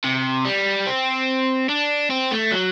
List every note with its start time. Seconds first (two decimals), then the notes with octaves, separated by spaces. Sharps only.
0.04 C3
0.45 G3
0.87 C4
1.69 D4
2.11 C4
2.31 A3
2.51 F#3